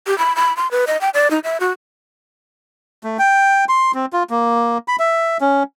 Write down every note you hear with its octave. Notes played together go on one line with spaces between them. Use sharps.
G4
B5
B5
C6
B4
D#5
G5
D5
D#4
E5
F#4
A3
G5
C6
C4
F4
A#3
B5
E5
C#4